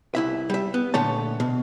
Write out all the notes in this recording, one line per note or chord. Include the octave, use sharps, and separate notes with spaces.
C2 E4 E5
G3 E5
B3
A#2 D3 A3 C#5 A5
B2